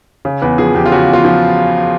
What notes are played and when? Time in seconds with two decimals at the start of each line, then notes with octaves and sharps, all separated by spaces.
0.25 C#3
0.42 E2 B4
0.58 F3 G#4
0.75 E2 G4
0.86 F4
0.91 C#3 F#4
1.08 E2
1.13 F4
1.25 F3